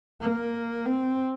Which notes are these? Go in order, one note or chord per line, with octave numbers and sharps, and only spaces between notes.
A#3
C4